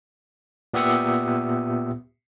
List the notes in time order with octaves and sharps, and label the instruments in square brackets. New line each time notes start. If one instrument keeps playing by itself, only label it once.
[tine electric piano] A#2 B3 G4 E5 D#6 C#7